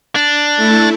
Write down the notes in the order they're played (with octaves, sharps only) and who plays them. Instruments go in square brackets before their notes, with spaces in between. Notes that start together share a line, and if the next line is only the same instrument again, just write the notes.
[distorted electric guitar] D4
[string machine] A3 E4